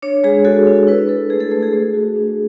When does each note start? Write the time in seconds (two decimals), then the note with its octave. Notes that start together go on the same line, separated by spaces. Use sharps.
0.02 D4 C#5
0.24 G#3 G#4
0.45 F#4 A4
0.67 D4
0.87 E4 B4
1.09 E4 A4
1.30 A3 G#4
1.40 A4
1.51 A3 A4
1.62 G#4
1.73 A3
1.94 F#4
2.16 D4